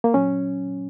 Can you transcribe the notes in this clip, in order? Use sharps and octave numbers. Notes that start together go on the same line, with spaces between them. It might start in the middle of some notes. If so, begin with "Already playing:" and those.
A#3
A#2 F#3 C#4